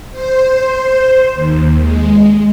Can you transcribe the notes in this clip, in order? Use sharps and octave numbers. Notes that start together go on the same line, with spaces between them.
C5
D#2
G#3